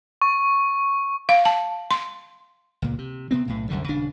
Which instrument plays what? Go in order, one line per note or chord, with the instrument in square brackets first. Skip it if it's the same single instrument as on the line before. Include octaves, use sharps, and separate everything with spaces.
[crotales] C#6
[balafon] F5
A5
C6
[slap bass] C#2 A#2
C3
C3 B3 C4
B1 A2
C2 F#2 D3 G3
D#1 C#3 D4